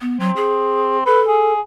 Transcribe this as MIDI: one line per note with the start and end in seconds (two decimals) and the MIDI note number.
0.01 0.18 59
0.20 0.31 54
0.20 1.02 60
0.36 0.98 68
1.06 1.53 69
1.06 1.21 71
1.28 1.60 68